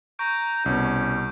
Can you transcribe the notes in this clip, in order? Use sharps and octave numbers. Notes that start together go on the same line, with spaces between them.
A#5 C#6 G6 D7
C2 B2 C#4